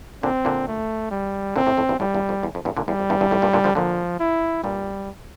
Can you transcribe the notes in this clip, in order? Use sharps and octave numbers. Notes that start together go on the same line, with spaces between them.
A#2 D3 C4
A#2 D3
A3
G3
A#2 D3 C4
A2 C3
F2 A2
E2 G2
F2 A2 G3
E2 G2
F2
E2
F2
E2 G2
A#2 D3
E2 G3
F2
E2 G2
E2 G2
F2 A2
G2 A#2
A#2 D3
D3 F3
A#2 D3 F3
E4
G2 A#2 G3